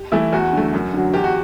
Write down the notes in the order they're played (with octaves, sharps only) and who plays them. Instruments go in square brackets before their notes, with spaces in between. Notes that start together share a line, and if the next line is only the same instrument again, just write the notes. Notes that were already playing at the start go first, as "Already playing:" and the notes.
Already playing: [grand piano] G4
[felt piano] E3 A3 [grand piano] E4
[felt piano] E2 [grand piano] F#4
[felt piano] D3 A3
F#2
D3 F#3
[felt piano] E2 [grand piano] G4
[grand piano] F#4